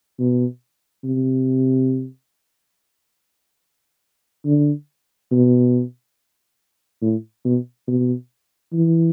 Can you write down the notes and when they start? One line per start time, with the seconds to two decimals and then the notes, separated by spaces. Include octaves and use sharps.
0.19 B2
1.04 C3
4.45 D3
5.31 B2
7.02 A2
7.45 B2
7.87 B2
8.73 E3